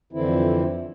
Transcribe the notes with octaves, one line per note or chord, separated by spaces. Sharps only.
F2 D3 E3 C4 E4